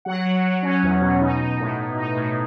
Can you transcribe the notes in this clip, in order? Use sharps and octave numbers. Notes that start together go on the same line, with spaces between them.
F#3 F#5
F#3
F#3
C#4
E2
B2
D#4
D#4
A2
A2
D#4
A2